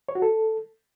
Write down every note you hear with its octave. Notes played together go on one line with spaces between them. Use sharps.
C#5
F#4
A4